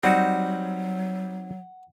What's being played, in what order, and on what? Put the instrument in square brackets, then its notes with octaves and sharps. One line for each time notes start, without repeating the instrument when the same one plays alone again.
[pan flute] F#3 [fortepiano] G3 [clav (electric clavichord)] C4 D#4 F#4 [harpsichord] F#5